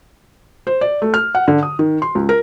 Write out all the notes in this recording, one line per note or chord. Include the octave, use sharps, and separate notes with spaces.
C5
D5
A3
F6
F#5
D3
D#6
D#3
C6
C#2
A#4